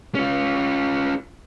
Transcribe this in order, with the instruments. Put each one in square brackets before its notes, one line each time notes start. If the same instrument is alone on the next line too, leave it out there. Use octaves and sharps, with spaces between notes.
[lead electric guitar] C#4 F4